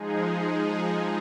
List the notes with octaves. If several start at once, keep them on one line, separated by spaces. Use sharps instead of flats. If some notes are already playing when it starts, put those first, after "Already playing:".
Already playing: F3 G#3 D#4 G#4